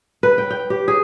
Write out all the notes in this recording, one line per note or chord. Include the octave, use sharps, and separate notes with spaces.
B4
G5
G5
G4
G#4